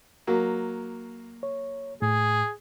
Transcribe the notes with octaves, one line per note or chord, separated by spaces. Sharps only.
F#3 A#3
C#5
A2 G#4